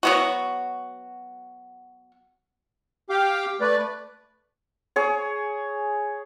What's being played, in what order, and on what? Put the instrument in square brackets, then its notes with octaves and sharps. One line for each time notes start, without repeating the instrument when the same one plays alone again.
[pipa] F#3 B3 F#4
[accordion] G4 F5 G5 D6
A3 B4 D5
[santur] G#4 C#5